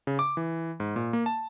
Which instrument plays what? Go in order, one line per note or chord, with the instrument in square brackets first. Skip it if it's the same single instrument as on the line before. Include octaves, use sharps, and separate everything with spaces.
[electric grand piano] C#3
D6
E3
G#2
A#2
A#3
A5